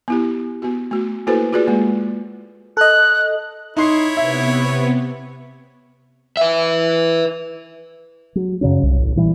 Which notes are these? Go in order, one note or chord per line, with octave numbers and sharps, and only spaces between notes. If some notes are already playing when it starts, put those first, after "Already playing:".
B3 E4 G4
B3 F#4
A3 F#4
A#3 E4 F#4 A4 B4 C5
F4 F#4 G#4 B4 D5
G#3 A#3
A4 D#5 F#6
D#4 E4 C#5 C6 C7
C3 B3 E5
B4 E5
F#3
F#2 C#3 F#3 C#4
C2
A1
A#2 E3 G3